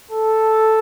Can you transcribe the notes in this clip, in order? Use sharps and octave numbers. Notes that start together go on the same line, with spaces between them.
A4